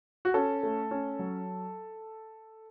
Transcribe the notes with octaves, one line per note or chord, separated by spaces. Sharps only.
F#4
C#4 A4
A3
C#4
F#3